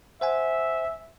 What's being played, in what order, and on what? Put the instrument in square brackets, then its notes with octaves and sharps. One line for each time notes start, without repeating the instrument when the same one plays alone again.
[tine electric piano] C5 F#5 G#5 [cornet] E5